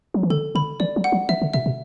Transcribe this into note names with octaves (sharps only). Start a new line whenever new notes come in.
F#3
E3
D3 A4
D3 B5
E3 D5
F#3
F#5
F#3
E3 E5
D3
B2 E5
B2